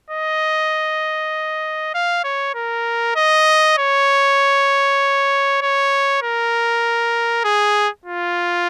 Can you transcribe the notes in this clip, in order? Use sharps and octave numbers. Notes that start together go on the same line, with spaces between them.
D#5
F5
C#5
A#4
D#5
C#5
C#5
A#4
G#4
F4